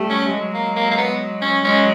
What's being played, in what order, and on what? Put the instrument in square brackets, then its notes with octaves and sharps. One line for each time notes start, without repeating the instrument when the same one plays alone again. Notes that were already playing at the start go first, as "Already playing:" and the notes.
Already playing: [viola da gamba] G3 A3
[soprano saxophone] C#4
[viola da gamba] F#3 G#3
[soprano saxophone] A#3
A#3
A#3
B3
C#4
[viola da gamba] F#3 G#3 [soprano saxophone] C#4